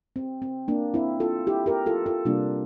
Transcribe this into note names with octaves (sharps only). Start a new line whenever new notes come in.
C4
C4
A#3 D4
C4 E4
F4 A4
E4 G4
G4 A#4
F4 A4
F4 A4
C3 G3 A#3 D4 F4